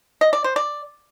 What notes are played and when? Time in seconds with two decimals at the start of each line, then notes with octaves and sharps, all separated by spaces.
0.21 D#5
0.33 D5
0.44 C5
0.56 D5